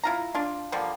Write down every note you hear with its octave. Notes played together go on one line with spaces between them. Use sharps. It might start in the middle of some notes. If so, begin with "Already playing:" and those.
E4 F4 A#5
D4 F4
D3 F3 G3 A#3